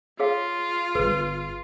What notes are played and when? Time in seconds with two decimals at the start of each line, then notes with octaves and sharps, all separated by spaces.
0.20 F4 G#4 C#5 F5
0.95 D1 G1 G#4 B4